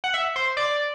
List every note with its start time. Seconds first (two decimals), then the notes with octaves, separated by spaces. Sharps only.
0.04 F#5
0.14 E5
0.36 C5
0.57 D5